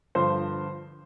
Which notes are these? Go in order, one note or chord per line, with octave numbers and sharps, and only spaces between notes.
G2 D3 F3 C5